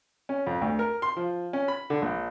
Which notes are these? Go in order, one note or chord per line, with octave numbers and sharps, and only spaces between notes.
C#4
F2
D2
A#4
C6
F3
C#4
B5
D3
A#1